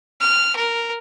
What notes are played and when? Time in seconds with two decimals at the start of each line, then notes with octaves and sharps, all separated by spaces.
0.20 F6
0.56 A#4